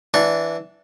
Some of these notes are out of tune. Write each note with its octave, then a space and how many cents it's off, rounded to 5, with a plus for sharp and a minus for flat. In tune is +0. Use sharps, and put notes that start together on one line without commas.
E3 +0 D4 +0 F#5 -25